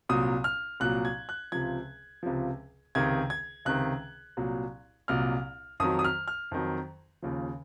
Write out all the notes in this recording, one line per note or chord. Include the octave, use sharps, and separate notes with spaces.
C2 A#2 F#3 D#6
F6
C2 A#2 F#3 F#6
G#6
F#6
C#2 C3 F3 G#6
C#2 C3 F3
C#2 C3 D#3 G#6
G#6
C#2 C3 D#3 F#6
C2 A#2 F#3
C2 A#2 F#3 F6
F2 D#3 F#3 D#6
D#6
F6
F6
F2 D#3 F#3
D#2 C#3 F3